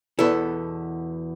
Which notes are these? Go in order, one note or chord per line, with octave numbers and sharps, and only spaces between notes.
E2 B2 B3 E4 A4